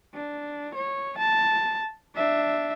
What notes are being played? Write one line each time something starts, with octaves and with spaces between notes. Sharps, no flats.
D4
C#5
A5
D4 E5